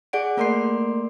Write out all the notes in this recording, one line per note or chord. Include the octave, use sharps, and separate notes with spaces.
G#4 D5 F#5 D7
A3 A#3 A#4 D5 C6 C7